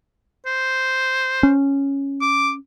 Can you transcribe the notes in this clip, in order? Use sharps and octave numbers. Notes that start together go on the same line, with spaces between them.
C5
C#4
D6